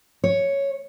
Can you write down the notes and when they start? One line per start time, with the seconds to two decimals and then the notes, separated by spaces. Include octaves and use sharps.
0.24 C#5